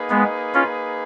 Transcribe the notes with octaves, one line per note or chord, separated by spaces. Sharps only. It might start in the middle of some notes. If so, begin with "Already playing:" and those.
Already playing: A#3 D#4 G#4 B4
G#3 B3
C#4 F4